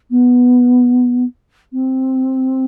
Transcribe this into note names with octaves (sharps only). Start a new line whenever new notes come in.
B3
C4